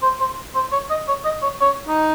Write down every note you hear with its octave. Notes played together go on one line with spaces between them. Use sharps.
C5
C5
C5
C#5
D#5
C#5
D#5
C#5
C#5
D#4